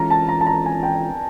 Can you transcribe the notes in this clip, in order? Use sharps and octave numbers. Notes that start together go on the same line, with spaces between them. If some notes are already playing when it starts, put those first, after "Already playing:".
Already playing: E3 G#3 C#4 F4 A4 A#5
A5
A#5
A5
A#5
G#5
G5